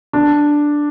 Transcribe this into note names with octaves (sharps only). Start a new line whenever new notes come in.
D4